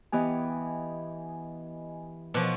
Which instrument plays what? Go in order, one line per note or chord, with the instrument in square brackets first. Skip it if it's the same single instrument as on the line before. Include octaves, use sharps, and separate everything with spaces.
[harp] E3 B3 G4 [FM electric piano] D#5 G#5
[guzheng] B2 F3 [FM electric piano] D6 F#6